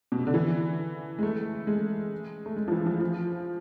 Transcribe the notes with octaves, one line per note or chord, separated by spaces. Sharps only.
B2
C3
D3
E3
G#3
A3
G#3
A3
G#3
F3
E3
F3
F3